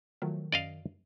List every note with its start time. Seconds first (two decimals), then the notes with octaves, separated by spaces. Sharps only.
0.22 D#3 F3 F#3 A3
0.52 F#2 D5 D#5 F5